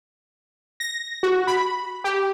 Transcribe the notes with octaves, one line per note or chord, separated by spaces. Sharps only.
A#6
F#4
B5
G4